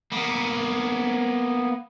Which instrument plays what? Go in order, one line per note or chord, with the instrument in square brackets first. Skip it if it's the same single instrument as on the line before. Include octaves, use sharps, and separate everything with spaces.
[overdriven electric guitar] A#3 B3